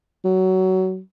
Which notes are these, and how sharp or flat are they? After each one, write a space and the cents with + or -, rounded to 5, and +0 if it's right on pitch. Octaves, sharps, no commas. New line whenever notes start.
F#3 +20